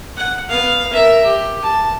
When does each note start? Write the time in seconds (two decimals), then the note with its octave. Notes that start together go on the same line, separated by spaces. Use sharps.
0.17 F#5
0.50 B3 F5
0.93 A#4 E5
1.25 G4
1.62 A5